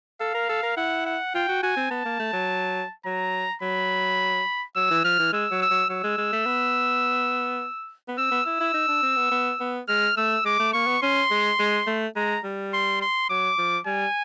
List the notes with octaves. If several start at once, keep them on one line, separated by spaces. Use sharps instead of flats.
A4 F5
A#4
A4
A#4
E4 F#5
F#5
F4 G5
F#4
F#4 G#5
C4
B3 A5
A#3
A3
F#3
F#3 A#5
F#3 B5
F#3 E6
E3
F3 F6
E3
G#3 E6
F#3
E6
F#3
F#3 E6
G#3
G#3
A3
B3
B3
C4 E6
B3
E4 E6
E4
D#4
D4
C4
B3
B3
B3
G#3 F6
A3 E6
G#3 D6
A3
A#3 C#6
B3
C#4 C6
G#3
G#3
A3
G#3 A#5
G3
C6
C6
F#3 D6
F3
G3 G#5